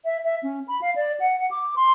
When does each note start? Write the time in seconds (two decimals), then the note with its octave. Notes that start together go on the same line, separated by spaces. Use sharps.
0.05 E5
0.24 E5
0.43 C#4
0.68 B5
0.82 F5
0.96 D5
1.20 F#5
1.39 F#5
1.51 D6
1.76 C6